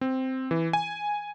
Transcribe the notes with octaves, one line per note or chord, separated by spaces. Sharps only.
C4
E3
G#5